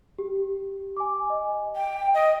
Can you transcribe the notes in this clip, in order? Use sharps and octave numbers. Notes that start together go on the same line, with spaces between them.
G4
G#5 D6
D#5
G5
D#5